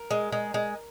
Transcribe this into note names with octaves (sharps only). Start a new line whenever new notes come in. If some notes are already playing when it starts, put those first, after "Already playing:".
Already playing: A#4
G#3
G#3
G#3